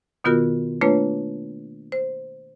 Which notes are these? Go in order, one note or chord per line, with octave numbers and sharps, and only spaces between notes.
B2 D#3 B3 F4 F#4 A#4
A3 A#3 D4 F4 B4 C#5
C5